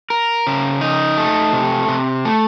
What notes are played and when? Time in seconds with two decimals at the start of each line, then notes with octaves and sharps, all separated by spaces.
0.10 A#4
0.47 C#3
0.81 D#4
1.17 A3
1.53 C3
1.88 C3
2.25 A3